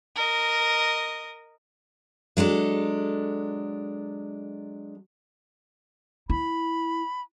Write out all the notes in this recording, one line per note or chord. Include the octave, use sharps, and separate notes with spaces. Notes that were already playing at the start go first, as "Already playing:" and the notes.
A#4 D#5
F#3 G#3 D4 A4
E4 B5